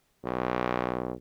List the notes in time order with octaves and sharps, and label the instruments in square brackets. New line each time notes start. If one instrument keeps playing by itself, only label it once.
[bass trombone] B1